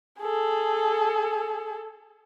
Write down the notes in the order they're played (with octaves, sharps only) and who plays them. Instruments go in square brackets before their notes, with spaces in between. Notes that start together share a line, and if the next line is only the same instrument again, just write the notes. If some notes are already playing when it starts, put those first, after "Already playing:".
[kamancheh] G#4 A4